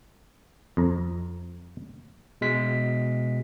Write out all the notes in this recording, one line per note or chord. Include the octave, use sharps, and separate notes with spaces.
F2 A#5
B2 G#3 B6